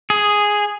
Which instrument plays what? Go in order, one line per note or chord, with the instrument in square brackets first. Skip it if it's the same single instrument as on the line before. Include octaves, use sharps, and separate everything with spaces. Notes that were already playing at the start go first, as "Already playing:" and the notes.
[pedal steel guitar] G#4